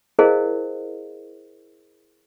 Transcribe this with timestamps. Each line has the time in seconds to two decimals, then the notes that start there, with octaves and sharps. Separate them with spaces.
0.19 E4 G#4 A#4 C5 D#5 F5